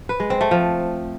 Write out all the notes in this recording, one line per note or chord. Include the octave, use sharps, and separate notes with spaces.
B4
G#3
C4
A3
F3